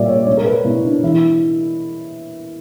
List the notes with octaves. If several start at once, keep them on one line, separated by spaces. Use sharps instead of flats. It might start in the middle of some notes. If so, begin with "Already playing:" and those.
Already playing: A#2 G3 D5 E5
C#5
G3 C#5
A#4
B4
B2 E4
D4
E3 E4